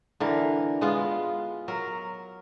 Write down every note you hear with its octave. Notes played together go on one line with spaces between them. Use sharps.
D3 E3 A#4
G#3 B3 F4
F#3 A#4